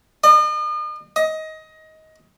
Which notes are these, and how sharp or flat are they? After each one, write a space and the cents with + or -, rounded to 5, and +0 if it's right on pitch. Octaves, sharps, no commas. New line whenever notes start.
D#5 -40
D#5 +20